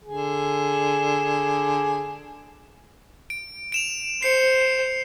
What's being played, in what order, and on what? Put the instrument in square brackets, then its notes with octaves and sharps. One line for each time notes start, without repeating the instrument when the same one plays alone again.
[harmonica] D3 G#4
[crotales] D7
D7 E7 F7
[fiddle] C5 [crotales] C7 C#7